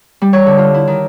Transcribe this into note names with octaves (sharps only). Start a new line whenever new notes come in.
G3
C#5
D3
F4
E4
D#3